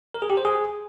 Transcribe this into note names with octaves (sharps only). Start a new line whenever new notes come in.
A#4
G#4
G4
C5
G#4